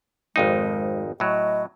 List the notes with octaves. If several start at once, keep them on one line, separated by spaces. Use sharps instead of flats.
G#1 F2 G#3 D#4
A2 F#3 D#5